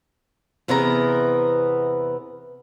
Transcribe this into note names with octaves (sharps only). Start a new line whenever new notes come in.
E2 C3 E3 B3 A#4 A#5